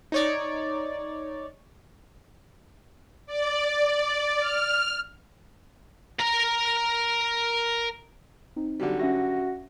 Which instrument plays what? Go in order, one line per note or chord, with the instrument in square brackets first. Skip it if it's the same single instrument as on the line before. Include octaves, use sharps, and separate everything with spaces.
[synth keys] D#4 C#5 D5
[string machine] D5
F6
[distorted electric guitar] A#4 A#5
[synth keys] C4 D#4
[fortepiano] D3 F#3 G3
[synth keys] C#4 E5 A#6 [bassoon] F#4